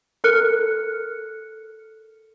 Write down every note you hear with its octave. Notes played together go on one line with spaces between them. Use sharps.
A4 A#4 F6 F#6 C#7